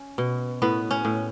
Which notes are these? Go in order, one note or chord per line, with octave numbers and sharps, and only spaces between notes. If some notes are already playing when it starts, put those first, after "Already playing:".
Already playing: C#4
B2
A2 B3
C#4
A2